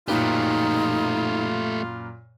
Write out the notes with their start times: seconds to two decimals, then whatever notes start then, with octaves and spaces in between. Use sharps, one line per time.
0.08 F#2 A#2 A3 D#4 F4 G4 B4